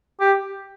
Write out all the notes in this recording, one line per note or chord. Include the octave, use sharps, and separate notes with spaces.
G4